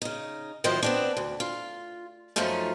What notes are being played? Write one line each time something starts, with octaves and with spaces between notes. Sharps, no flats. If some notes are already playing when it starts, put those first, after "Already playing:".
C#3 D#4
A2 D#3 F3 F#3 C5 D#5
B3 C4 D4
D2
F4
F#2 F3 A3 C#4 D#4 F4